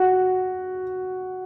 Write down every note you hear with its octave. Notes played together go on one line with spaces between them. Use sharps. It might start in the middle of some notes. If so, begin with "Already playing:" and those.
Already playing: F#4